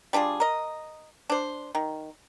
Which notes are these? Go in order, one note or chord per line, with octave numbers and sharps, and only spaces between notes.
G3 D4 F4 G#4
A#4 D#5
D4 C5
D#3